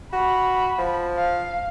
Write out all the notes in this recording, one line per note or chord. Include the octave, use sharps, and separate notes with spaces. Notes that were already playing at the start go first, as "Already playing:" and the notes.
F#4 B5
F3
F5